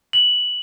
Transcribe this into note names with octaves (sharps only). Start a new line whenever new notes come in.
F#7